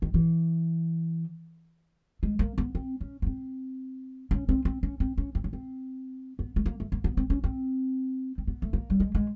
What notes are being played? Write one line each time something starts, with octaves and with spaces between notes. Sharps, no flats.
D#3
E3
G#3
A#3
B3
C4
C#4
B3
C4
C#4
C4
C4
C#4
C4
C#4
C4
C#4
C4
B3
A3
A#3
A3
A#3
B3
C4
C#4
C4
C4
B3
A3
A#3
G3
G#3
G#3